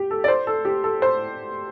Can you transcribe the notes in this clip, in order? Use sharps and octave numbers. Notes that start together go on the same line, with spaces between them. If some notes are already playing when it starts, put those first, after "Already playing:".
Already playing: G4
A4
D5
C5
A4
G4
A4
C5